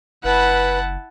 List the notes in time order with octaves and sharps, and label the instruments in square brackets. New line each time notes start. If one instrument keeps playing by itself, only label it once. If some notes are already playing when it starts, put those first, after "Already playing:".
[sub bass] F#1 [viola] E4 A5 [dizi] B4 [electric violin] F#5